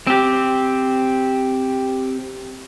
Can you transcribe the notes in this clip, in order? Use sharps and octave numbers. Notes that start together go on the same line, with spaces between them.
C4 G4